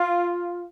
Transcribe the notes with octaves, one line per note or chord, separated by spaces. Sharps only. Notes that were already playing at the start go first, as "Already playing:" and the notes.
Already playing: F4